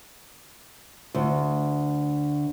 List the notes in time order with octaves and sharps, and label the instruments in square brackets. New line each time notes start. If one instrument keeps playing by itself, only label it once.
[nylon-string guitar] D2